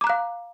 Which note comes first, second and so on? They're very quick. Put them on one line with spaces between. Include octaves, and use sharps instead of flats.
D6 A#5 F#6 F5